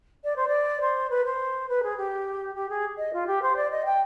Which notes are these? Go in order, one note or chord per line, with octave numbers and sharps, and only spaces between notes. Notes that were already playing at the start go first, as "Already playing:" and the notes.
D5
C5
D5
C5
B4
C5
B4
G#4
G4
G4
G#4
D#5
F4
G4
C5
D5
D#5
G5